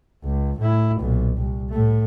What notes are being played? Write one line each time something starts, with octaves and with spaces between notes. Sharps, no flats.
C#2
A2 E4
B1 A#2
C2
A2 A3